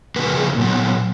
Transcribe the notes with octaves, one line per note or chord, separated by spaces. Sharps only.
C#3 F3 A#3 B4
A#4
G#4
A#2 F#3 B3